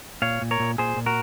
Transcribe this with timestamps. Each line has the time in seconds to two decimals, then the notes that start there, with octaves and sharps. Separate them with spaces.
0.22 A#2 C#5 F5
0.42 A#2
0.51 A#4 C#5
0.60 A#2
0.78 A#2 G#4 C5
0.97 A#2
1.06 F#4 A#4